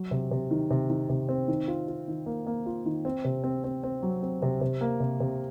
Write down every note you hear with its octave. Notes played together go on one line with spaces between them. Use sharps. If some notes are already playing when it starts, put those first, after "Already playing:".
Already playing: F#3
C3
C3
D#3
C3
D#3
C3
C4
D#3
F4
F4
D#3
A#3
A#3
F4
D#3
C4
C3
C4
C4
C4
F#3
C4
C3
C3
A#3
C3
C3